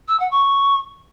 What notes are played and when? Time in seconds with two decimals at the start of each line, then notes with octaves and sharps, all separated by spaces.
0.08 E6
0.19 F#5
0.31 C#6